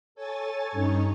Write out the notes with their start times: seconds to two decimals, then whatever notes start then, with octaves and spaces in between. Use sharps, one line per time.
0.15 A4 C#5 G#5 A6
0.72 G2 C#4 D#4 C#5